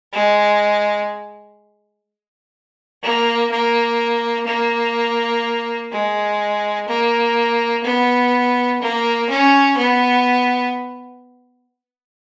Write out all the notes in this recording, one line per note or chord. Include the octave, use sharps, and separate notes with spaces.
G#3
A#3
A#3
A#3
G#3
A#3
B3
A#3
C#4
B3